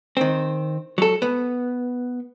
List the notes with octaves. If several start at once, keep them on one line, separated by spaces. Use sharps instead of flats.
D#3 C4
F#3 A4
B3